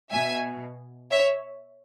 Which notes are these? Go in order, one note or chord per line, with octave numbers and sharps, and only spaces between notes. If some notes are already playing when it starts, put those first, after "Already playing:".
B2 E5 G#5
C#5 E5